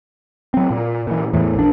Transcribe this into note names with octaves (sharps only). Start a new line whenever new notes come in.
F#3 C4
A#2
A#2 E3
E2 A2 E3
A#1 D4